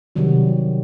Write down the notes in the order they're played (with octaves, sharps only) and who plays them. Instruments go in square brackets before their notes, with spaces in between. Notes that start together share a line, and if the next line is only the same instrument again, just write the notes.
[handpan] C3 D#3 F#3 G3 F#4